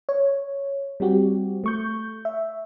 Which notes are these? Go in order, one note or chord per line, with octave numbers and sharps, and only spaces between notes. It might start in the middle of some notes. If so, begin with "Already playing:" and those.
C#5
G3 C4 F#4 G4
A3 C#6 G6
E5